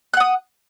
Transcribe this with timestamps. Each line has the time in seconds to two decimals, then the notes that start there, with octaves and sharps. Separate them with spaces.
0.14 F#6
0.17 F#5
0.20 D#6